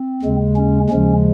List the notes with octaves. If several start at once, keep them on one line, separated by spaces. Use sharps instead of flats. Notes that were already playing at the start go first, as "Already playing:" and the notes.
Already playing: C4
D#2 C#3 G#3
C#4
D#2 C#3 F3 G#3 C#4